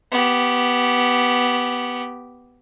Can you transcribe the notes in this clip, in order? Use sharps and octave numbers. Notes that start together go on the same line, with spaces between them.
B3 G4